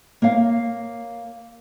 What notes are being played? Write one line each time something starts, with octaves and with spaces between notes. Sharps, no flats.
A#3 C#5 F5